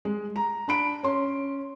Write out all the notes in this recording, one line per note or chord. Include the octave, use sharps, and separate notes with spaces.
G#3
A#5
D4 B5 D7
C#4 C6